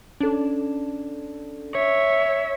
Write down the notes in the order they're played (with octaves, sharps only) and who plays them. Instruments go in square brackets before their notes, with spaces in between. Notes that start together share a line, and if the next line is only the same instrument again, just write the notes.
[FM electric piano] C#4 A4 [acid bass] D4
[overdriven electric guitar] C#5 [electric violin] E5